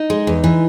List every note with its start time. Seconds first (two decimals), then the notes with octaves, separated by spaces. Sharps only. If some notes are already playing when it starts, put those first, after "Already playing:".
Already playing: D#4
0.10 G#3
0.27 E2
0.44 E3